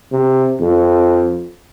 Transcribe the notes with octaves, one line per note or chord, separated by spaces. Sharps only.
C3
F2